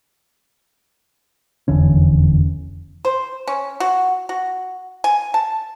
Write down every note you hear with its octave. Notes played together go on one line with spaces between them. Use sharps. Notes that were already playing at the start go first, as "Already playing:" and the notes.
F1 E2 D3 C#4
C5
C#4
F#4
F#4
G#5
A5